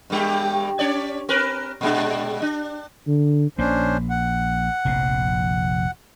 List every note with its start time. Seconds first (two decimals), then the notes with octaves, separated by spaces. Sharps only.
0.10 G2 G3 G4
0.79 C#4 C#5 D5
1.29 C4 A#4 B4
1.81 A#2 G#3 D4
2.42 D4
3.07 D3
3.58 A#1 A#3 C#4 D4 C5
4.10 F#5
4.85 F1 A#1 C3